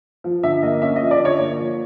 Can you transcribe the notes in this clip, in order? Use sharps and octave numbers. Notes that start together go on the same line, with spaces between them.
F3
D3 E5
A#3 D#5
C#4 E5
D#5
F3
D5
D3
C#5
A#3
F3